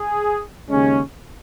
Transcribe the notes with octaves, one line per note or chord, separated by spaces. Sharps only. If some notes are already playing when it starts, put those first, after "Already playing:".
Already playing: G#4
D#2 C#3 G#3 C#4